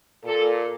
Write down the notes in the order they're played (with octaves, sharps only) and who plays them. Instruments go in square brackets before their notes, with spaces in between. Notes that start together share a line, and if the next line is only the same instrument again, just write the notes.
[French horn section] A#2 A4